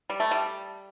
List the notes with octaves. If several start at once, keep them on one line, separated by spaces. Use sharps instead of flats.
G3
A3
G3